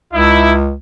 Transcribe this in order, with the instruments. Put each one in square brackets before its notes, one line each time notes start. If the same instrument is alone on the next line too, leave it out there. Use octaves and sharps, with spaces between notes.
[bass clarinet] C#2 [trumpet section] D#4 E4